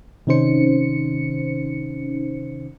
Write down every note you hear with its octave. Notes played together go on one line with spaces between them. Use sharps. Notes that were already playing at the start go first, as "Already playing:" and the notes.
C3 D#3 C#4 D#4 C5 C#7